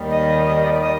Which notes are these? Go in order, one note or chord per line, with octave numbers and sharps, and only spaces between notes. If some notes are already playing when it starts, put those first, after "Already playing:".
Already playing: D#2 D#3 G3
D#5
D#5
D5
D5
D#5